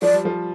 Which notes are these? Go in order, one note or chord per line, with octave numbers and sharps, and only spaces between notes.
F3 D5
G3
F3